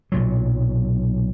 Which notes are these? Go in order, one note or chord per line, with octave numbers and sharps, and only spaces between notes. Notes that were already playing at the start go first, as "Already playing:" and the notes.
B1 A#2 F#3